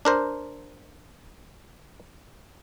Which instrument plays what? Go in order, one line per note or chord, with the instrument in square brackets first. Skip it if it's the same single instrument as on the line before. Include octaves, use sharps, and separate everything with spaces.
[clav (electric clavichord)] D4 A#4 C5